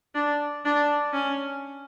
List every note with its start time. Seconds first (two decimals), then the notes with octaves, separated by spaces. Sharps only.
0.15 D4
0.65 D4
1.13 C#4